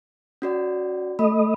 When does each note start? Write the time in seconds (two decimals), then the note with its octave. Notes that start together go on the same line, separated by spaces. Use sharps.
0.42 C#4 F#4 D5
1.19 A3 D#5 B5